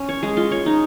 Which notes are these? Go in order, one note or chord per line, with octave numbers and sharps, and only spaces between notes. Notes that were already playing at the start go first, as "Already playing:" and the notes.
Already playing: C#4
C#5
G#3
F4
C#5
D#4